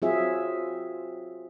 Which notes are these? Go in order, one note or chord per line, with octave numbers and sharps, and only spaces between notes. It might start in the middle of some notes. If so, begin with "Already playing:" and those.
F#3 C4 F4 G#4 E5